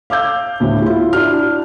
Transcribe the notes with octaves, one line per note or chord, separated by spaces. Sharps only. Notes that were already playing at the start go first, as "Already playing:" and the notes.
F5 D6 E6 G6
D2 A2
E4 F4
D4 E4 F#4 F6